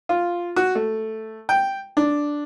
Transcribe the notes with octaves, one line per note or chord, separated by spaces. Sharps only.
F4
F#4
A3
G5
D4